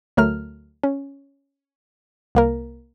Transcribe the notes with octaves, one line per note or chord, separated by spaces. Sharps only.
D2 F#3 A3 A#4 F6
C#4
C2 A#3 A#4